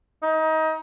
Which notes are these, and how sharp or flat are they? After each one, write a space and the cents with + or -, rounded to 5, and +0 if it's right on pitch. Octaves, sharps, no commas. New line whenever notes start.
D#4 +25